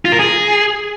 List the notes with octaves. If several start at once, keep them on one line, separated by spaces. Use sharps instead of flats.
F4
A#4
G#4